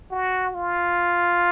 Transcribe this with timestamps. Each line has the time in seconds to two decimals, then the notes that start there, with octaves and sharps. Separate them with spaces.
0.11 F#4
0.55 F4